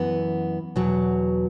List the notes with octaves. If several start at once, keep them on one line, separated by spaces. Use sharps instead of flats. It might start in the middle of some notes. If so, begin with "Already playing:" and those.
Already playing: F#2 E3 B3
E2 B2 F#3